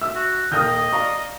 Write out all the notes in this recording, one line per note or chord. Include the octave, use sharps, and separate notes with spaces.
E5 E6
F#4
D#1 A#3 D#5 G5 D#6 F6 G6
D5 F5 A#5 C#6